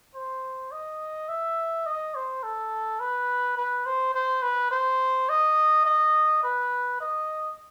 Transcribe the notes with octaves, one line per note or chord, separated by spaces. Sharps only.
C5
D#5
E5
D#5
C5
A4
B4
B4
C5
C5
B4
C5
D#5
D#5
B4
D#5